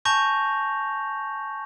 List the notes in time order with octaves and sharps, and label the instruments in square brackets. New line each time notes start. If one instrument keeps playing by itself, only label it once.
[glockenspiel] G#5 A5 C#6 G6 A#6 F7